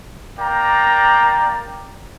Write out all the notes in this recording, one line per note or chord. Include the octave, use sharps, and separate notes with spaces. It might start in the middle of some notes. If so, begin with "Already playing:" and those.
A#3 A#4 D5 G5 A#5